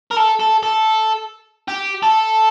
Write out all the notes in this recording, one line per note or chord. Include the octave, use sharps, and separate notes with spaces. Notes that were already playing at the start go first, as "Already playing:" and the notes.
A#4
A4
A4
A4
G4
A4